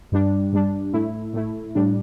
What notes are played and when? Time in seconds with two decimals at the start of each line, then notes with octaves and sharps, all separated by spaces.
0.12 G2 G3 D4
0.53 G2 G3 D4
0.94 A2 A3 E4
1.34 A2 A3 E4
1.75 A2 G3 D4